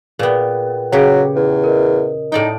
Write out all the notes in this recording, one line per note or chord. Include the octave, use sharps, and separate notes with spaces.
A#2 B3 G#4 B4 G5
C#3 F#3 G4
E2
A#4 D#5
A2 D#4 D5 G5